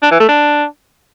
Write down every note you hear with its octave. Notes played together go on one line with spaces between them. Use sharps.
D4
E3
A3
D4